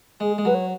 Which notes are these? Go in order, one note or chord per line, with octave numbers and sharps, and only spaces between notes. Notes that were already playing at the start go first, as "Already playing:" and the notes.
G#3 G#4
G#3 G#4
F#3 B4
C#5